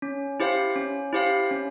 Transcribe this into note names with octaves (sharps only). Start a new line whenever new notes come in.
C#4
E4 G4 C5 F5
C#4
E4 G4 C5 F5
C#4